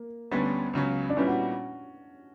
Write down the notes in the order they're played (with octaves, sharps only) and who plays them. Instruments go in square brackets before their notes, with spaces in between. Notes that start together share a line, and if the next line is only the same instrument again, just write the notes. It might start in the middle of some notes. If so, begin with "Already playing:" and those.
Already playing: [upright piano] A#3
[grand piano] D2 D3 G3 C#4 [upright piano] B3
[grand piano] C#2 C#3 F#3 C#4
[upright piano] D4
[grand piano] A#2 G3 B3 E4 [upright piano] C#4
[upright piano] F#4